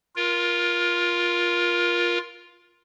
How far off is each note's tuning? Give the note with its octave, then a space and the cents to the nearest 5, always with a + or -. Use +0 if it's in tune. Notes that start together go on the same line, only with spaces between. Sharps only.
F4 +0 A#4 +20